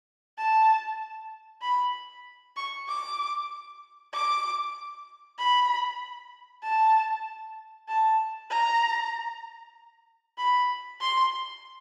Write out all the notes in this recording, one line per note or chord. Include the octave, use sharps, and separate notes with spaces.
A5
B5
C#6
D6
D6
B5
A5
A5
A#5
B5
C6